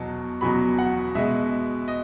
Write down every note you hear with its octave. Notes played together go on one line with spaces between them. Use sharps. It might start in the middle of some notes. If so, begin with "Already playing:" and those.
Already playing: E2 B2 F#3 A5
E2 B2 F#3 B5
F#5
B2 G#3 E5
D#5